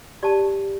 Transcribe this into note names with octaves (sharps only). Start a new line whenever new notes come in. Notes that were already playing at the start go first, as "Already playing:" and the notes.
G4 D5 A5